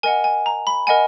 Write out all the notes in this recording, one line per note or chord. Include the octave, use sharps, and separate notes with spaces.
A#4 D#5 F#5 G#5
G#5
A#5
B5
A#4 D#5 F#5 G#5